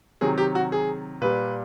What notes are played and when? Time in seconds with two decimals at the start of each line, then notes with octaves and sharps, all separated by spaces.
0.21 C3 D#3 F#3 G#4
0.38 G4
0.55 F#4
0.72 G#4
1.21 A#2 G3 B4